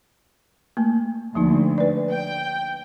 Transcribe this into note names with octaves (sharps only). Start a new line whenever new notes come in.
A3 A#3
D2 F3 A#3 D#4
B4 D5
G5